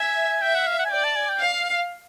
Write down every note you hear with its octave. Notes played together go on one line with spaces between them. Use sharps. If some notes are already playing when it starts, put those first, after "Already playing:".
Already playing: E5 G#5
E5 G5
F#5
F5
F#5
G#5
D5 G5
A5
G#5
G5
F5